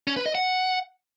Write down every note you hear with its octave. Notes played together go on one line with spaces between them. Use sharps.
C#4
B4
D#5
F#5